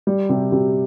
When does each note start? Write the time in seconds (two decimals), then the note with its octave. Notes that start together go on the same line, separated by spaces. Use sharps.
0.07 G3
0.29 C3
0.52 C3